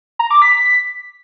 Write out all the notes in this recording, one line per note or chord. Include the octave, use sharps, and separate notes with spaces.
A#5
D6
B6